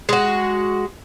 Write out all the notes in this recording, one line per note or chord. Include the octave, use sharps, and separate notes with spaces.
G#3 F#4